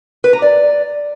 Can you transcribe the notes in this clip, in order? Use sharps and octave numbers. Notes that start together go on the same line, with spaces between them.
B4
A#5
D5